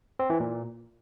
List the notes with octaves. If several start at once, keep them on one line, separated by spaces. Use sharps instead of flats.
C4
E3
A#2